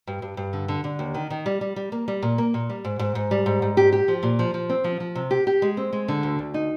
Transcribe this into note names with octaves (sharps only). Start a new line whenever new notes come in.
G2
G2
G2
D3
D3
D3
D#2
D#3
D#3
G3
G3
G3
A#3
G3
A#2
A#3
A#2
G3
G#2
G#2
G#2
G3
G#2
G#2
G4
G4
F3
A#2
F3
F3
C4
F3
F3
C3
G4
G4
G#3
C4
G#3
D3
D2
D2
D#4